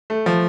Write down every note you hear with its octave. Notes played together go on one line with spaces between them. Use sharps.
A3
F3